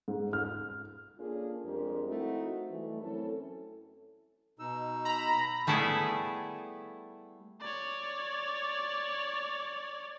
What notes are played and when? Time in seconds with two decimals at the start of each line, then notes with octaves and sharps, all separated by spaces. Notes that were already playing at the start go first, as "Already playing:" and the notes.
0.08 G#2
0.33 F6
1.18 A#3 C#4 D4 F4 G#4 A4
1.65 F2 G3 G#3 D4 G4 A#4
2.08 A3 C4 D#4 E4 F#4
2.70 E3 G3 A3
3.02 F#2 C4 C#4 E4 A4
4.59 B2 D#4 E6
5.05 A#5 B5
5.67 G3 A3 B3 E4 G#4
7.61 C#5 D5